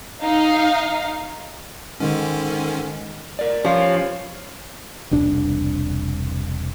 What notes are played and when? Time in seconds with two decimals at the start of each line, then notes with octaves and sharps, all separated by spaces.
0.22 D#4 F5
2.00 G#2 D3 D#3 C#4
3.39 A#4 D5
3.65 F3 C#4 F4 G4 C#5 F5
5.11 E1 C2 D4